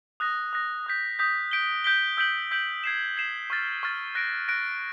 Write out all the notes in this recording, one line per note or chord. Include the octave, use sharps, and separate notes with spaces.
D#6 F#6 A#6
D#6 F#6 A#6
D#6 G6 B6
D#6 G6 B6
G6 B6 D7 G7
G6 B6 D7 G7
E6 G6 B6 D7 F#7
E6 G6 B6 D7 F#7
G#6 C7 E7
G#6 C7 E7
C#6 F6 A6
C#6 F6 A6
F#6 A#6 D7
F#6 A#6 D7